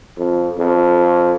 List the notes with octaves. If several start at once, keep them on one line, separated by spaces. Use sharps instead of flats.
F2
F2